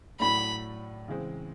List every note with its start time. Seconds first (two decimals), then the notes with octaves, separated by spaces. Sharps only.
0.20 A2 F#3 A3 D4 B5
1.08 C#3 E3 G#3 C4